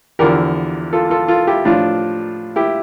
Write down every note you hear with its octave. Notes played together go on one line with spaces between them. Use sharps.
E2 D3 F3 G4 A#4
F4 A4
F4 A4
F4 A4
E4 G4
A2 F3 D4 F4
E4 G4